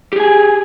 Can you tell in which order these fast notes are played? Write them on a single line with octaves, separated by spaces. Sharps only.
G4 G#4 G#5